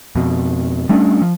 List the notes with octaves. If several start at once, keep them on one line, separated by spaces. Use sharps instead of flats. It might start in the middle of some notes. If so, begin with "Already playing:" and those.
F2 B2
G3 A3 C#4 D4
F3